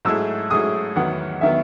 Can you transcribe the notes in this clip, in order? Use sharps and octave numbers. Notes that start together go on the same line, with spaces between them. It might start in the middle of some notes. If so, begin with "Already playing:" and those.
G#2 F#3 A3 E4 G#4 E6
G#2 F#3 A3 E4 G#4 D#6
E2 D#3 F#3 B3 F#5
D#3 F#3 B3 E5